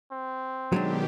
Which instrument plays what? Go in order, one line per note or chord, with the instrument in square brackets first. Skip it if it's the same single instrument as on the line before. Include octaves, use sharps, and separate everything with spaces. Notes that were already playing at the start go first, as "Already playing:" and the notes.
[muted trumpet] C4
[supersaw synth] B2 D#3 G4 [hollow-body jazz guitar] F#3 G#3 D4